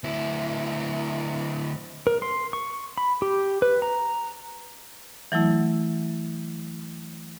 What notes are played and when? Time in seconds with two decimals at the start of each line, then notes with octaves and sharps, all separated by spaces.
0.04 D2 E4
2.07 A#4
2.22 C6
2.53 C#6
2.98 B5
3.22 G4
3.62 B4
3.82 A#5
5.32 E3 F#3 A3 E4